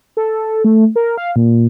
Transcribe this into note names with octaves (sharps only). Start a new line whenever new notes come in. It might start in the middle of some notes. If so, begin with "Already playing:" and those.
A4
A3
A#4
F5
A#2